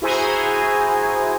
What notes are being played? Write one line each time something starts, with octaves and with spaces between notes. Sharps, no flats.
E4 F#4 G#4 C5 G#5 A#5